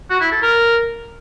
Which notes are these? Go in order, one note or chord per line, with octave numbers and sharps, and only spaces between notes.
F#4
E4
A4
A#4